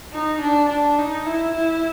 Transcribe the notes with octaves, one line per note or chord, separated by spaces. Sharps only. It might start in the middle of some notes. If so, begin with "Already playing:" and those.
D#4
D4
D4
D#4
E4
E4